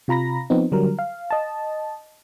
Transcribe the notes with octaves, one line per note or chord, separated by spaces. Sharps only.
C3 F4 A#5 B5 A#6
F3 B3 C4 D#4
D3 F#3 G3 A#4
F5
D#5 A5